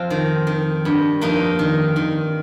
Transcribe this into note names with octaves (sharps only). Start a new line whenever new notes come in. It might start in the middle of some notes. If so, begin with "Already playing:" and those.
Already playing: F2 C4 F4
D#3
D#3
G2
F2 A#3 D#4
D#3
D#3